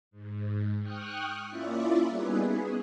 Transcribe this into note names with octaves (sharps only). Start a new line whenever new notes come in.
G#2
G5 C#6 D#6 F6 F#6
A#3 C#4 E4 F4 D5 E5
G3 B3 D#4 G#4 B4
B3 F#4 G#4